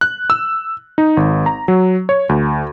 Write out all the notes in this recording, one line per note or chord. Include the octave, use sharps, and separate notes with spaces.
F#6
E6
D#4
G#1
A#5
F#3
C#5
D2